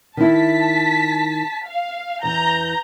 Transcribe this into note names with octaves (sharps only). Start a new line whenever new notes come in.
D#3 E4 A5 B6
F5
E2 E3 A#5 G6